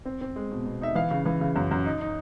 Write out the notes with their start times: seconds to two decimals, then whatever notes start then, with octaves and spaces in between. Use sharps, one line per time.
0.05 C4
0.21 C4
0.36 G#3
0.51 B2
0.66 B2
0.81 D#4 E5
0.95 E3 F5
1.11 C#3
1.26 E3
1.41 C#3
1.56 F#2
1.71 F#2
1.86 D#4
2.01 D#4